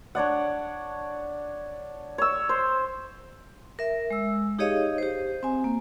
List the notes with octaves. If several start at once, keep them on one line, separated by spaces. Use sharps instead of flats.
D4 C#5 D5 F#5
C#5 E6
C5
A#4 E5
G#3 E6
D#4 G4 G#4 C#5 D#5 F5
G4 C5
C4 G#5
A#3